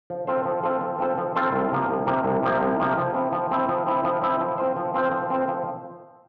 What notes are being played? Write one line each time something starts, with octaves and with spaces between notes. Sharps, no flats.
F3
C4 F4 A4 C5
F3
C4 F4 A4 C5
F3
C4 F4 A4 C5
F3
C4 F4 A4 C5
C2
C3 F3 A#3
C2
C3 F3 A#3
C2
C3 F3 A#3
C2
C3 F3 A#3
F3
C4 E4
F3
C4 E4
F3
C4 E4
F3
C4 E4
F3
C4 F4 C5
F3
C4 F4 C5
F3
C4 F4 C5
F3